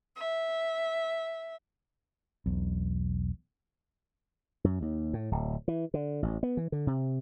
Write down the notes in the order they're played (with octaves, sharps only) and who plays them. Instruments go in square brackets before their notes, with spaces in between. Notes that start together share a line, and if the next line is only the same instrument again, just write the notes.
[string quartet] E5
[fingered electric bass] E1 B1
[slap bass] F#2
D#2
A2
D1
E3
D3
A1
B3
E3
D3
C3